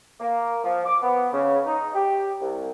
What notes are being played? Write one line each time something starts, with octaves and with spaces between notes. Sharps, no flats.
A#3
F3
D6
B3
C#3
D#4
G4
C2